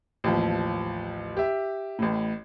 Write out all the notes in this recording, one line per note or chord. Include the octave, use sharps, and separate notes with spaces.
A1 D#2 F3
G4 E5
A1 A2